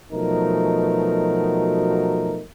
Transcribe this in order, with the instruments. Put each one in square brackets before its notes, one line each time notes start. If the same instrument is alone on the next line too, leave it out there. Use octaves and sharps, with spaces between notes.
[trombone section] B2 F3 F#3 A3 D#4 A#4